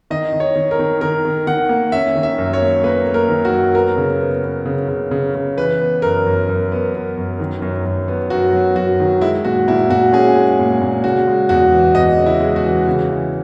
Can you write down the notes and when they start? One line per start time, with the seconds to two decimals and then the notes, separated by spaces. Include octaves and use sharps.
0.10 D#3 D#5
0.33 D#3
0.40 C#5
0.55 D#3
0.71 A#4
0.79 D#3
1.01 D#3 A#4
1.25 D#3
1.47 D#3 F#5
1.69 A#3
1.92 C#4 E5
2.15 D#3
2.23 E5
2.38 F#2
2.53 C#5
2.61 A#3
2.84 A#3 B4
3.07 A#3
3.14 A#4
3.29 D#3
3.45 F#4
3.52 F#2
3.75 B3 A#4
3.97 C#3
4.21 B3
4.44 B3
4.66 C#3
4.88 C#3
5.11 C#3
5.35 C#3
5.57 E3 B4
5.80 B3
6.02 F#2 A#4
6.26 F#2
6.48 F#2
6.72 B3
6.95 B3
7.17 F#2
7.40 D#3
7.62 F#2
7.85 F#2
8.08 B3
8.30 F#2 F#4
8.53 F#3
8.76 F#2 F#4
9.00 D#3
9.21 G#3 E4
9.45 A#2 F#4
9.68 A#2 E4
9.90 A#2 F#4
10.13 C#4 G#4
10.35 G#3
10.59 A#2
10.81 A#2
11.04 C#3 F#4
11.27 G#3
11.49 E2 F#4
11.72 E3
11.95 E2 D#5
12.18 C#3
12.26 E4
12.40 G#3
12.56 F#4
12.64 E3
12.87 C#3
13.09 E3